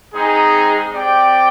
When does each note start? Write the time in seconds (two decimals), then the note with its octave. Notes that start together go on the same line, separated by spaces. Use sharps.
0.12 G#3 C4 D#4 G#4
0.93 C4 G4 D5 G5